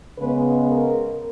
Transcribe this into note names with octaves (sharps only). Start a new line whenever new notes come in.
C#3 G#3 B3 B4
A#4